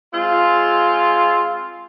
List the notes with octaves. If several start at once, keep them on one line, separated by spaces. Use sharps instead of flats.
G#3 C4 F4